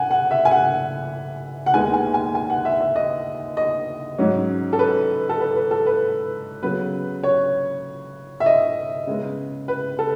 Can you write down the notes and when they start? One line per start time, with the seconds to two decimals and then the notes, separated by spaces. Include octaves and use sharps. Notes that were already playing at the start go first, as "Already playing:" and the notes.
Already playing: C#3 F#5 G#5
0.11 F#5
0.31 E5
0.45 G#5
0.51 F#5
1.66 F#5
1.74 D#2 D#3 G#3 B3 D#4 G#5
1.94 G#5
2.14 G#5
2.35 G#5
2.50 F#5
2.65 E5
2.81 E5
2.96 D#5
3.57 D#5
4.18 G#2 F#3 C#4
4.73 A4
4.79 B4
5.29 A4
5.40 B4
5.56 B4
5.71 A4
5.86 B4
6.63 C#3 F#3 B3 B4
7.23 C#5
8.40 E5
8.46 D#5
9.07 C#3 G#3 B3
9.68 B4
9.99 A4